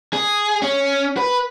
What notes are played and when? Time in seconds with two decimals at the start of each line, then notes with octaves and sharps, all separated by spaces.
0.13 G#4
0.62 C#4
1.17 B4